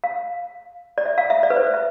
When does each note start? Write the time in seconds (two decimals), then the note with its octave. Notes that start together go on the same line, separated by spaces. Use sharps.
0.04 F5
0.98 D5
1.05 E5
1.18 F5
1.30 E5
1.43 D5
1.50 B4
1.56 C5
1.74 E5